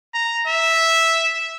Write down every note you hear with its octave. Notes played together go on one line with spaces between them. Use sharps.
A#5
E5